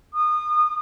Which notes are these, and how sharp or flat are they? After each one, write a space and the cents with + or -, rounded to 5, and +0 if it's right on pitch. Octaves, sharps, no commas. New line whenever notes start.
D#6 -30